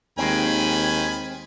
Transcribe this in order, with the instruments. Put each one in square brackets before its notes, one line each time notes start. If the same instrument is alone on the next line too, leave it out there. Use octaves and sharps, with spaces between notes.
[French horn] D#2 [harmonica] D#3 G#5 B5 [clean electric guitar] G#3 C4